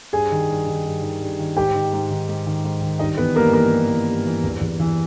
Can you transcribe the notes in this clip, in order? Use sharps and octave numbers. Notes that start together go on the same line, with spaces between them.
G2 G#4 G#5
D#3
G2
D#3
G2
D#3
G2
D#3
G#2 G4 G5
D#3
G#2
D#3
G#2
D#3
G#2
D#3
G2 D#4 D#5
E3 B3 B4
G2 A#3 A#4
E3 A#3 A#4
G2
E3
G2
E3
E2
E2
E3